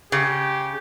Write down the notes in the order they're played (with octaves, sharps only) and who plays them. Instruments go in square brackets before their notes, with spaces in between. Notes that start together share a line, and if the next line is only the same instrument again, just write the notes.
[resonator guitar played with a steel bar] C#3 [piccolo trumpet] G4